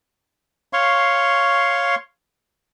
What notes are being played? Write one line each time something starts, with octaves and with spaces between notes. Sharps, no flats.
C#5 F5 C6 C#6